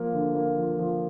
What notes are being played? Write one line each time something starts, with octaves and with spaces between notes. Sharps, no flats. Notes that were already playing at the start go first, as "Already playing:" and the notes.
Already playing: F3 A#3
D3
A#3
F3
F3